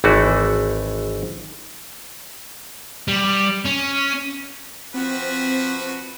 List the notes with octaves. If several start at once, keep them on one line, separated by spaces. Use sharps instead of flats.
G#1 E3 A3 F#4
G3
C#4
F3 C4 F#4 B4